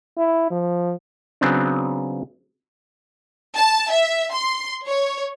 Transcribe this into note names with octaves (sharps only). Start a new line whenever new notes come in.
E4
F3
C#3 F#3 B3 C4 D4
A5
E5
C6
C#5